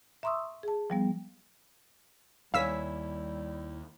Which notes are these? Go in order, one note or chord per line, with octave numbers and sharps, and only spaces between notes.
E5 A#5 C6 C#6 D#6 E6
G#4 A5
F3 G3 B3
D#2 G3 E4 C#5 F5 G#5 E6 B6